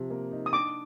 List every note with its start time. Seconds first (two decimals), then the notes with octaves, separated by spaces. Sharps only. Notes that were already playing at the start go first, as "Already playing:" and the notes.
Already playing: C3 F3
0.10 A#3
0.32 D#4
0.46 D#6
0.53 D4 D6